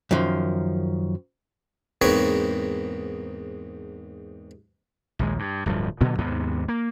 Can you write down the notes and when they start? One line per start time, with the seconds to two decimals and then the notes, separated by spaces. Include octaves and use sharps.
0.11 F#2 D#3 F3
2.02 E2 G#2 A#3 C4 B4 C#5
5.19 A#1 D#2 G#3
5.39 G2
5.66 D1 G2 F3
6.01 A#2 D3 F#3 B3
6.18 D#2 G#2 C3 B3
6.68 A#3